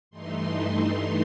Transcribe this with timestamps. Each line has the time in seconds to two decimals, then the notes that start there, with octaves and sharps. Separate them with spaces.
0.10 G2 E3 A3 D#4 C6